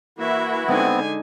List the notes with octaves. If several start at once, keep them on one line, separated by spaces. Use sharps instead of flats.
E3 A#3 E4 F#4 E5
D3 G#3 B3 C4 D#4 G#5